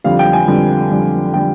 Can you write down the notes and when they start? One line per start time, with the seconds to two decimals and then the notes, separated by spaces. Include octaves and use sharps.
0.04 F2 D3 G3 F5
0.19 G5
0.33 G#5
0.47 F2 D3 G3
0.90 F2 D3 G3
1.34 D3 G3 G5